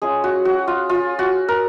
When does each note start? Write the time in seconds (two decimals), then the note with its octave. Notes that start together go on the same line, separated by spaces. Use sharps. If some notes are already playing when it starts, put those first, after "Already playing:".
0.02 G#3 C#4 F4 G#4
0.24 F#4
0.45 F#4
0.68 F4
0.89 F4
1.19 F#4
1.48 A#4